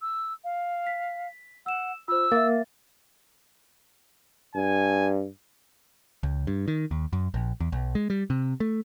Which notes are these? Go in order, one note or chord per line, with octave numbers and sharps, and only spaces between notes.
E6
F5
B6
F#5 E6 E7
F4 C5 E6
A#3 E5 A6
G2 G#5
C#2
G2
D#3
D#2
F#2
A#1
E2
B1
G#3
G3
C3
A3